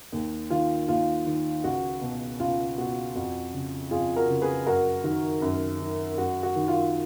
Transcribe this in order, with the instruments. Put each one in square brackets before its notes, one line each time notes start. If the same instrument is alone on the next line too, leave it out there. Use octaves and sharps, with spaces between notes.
[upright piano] D#2
D#3 F4
D#2 F4
D#3
C#2 F#4
B2
C#2 F4
B2 F#4
F2 F#4
C#3
F2 F4 G#4
F#4 A#4
C#3
G#4 B4
F#2 F#4 A#4
D#3 F#4
F#2
D#3
F#2 F#4
F#4
D#3
F4